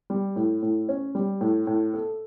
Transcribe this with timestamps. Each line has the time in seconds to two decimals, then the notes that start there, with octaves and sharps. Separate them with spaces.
0.10 G3
0.36 A2
0.62 A2
0.89 C#4
1.15 G3
1.41 A2
1.67 A2
1.94 A4